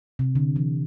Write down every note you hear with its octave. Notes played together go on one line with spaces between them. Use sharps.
C3
D3
E3